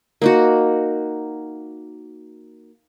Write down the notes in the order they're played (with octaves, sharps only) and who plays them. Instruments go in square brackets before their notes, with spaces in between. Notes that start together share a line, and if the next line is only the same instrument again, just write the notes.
[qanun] A#3 D#4 F#4